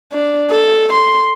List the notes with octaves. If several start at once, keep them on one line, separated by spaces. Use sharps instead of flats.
D4
A4
C6